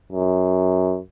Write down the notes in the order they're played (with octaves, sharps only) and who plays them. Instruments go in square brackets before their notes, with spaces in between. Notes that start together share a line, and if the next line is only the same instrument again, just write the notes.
[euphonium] F#2